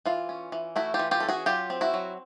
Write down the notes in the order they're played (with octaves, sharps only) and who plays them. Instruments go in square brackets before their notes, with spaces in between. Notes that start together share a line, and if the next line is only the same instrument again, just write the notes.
[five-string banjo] E3 F4
C#4
E3
A3 E4 F#4
F4 G4
E3
F4 G4
C#4 A4
F#4 G#4
F#3 F4 G4
C4
E4 F#4
F#3